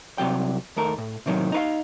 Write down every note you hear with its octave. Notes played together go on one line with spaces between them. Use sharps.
C2 C3 F#3 G5
D#2 A3 A#4
A2
A2 C3 D#3 F#3
D#4 B4 F5